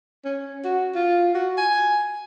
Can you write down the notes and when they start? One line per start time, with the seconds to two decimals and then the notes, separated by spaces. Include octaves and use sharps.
0.25 C#4
0.64 F#4
0.95 F4
1.34 F#4
1.58 G#5